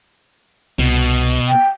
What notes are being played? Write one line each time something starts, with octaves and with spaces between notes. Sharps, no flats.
C2 B2
G5